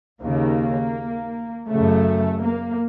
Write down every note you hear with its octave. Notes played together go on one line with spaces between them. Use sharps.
D#2 C#3 A#3
C#3 A3
F#2
A#3